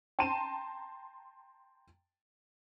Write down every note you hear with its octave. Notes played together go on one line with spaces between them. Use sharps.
G5 A5 A#5 C6 D#7 E7